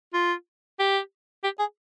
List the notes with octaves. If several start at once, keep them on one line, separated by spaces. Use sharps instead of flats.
F4
G4
G4
G#4